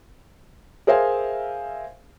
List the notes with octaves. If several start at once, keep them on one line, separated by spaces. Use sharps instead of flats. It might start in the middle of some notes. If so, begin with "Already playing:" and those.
G#4 A#4 C5 E5 F5 G#5